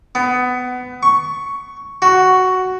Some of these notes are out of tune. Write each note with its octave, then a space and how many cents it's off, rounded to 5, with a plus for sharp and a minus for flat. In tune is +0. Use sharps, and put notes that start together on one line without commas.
B3 +20
C#6 +5
F#4 +5